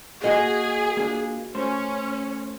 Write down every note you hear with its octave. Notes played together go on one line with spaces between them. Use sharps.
A#3 F#4 G#4 D#5
A#3 D4 F4
A3 C#4 C5